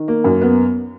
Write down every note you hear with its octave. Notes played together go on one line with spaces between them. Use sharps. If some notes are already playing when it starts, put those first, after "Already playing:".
Already playing: D#3
A#3
F#2
B3